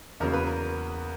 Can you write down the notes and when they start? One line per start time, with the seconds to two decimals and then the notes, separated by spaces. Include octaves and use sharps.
0.20 E2 C#3 F#3 A#3 A#4
0.33 B4
0.47 A#4